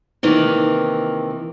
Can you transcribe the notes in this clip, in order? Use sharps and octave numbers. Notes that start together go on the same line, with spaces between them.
C3 D#3 E3 A#3